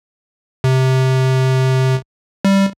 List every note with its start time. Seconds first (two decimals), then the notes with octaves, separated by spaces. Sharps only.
0.64 C3
2.45 G3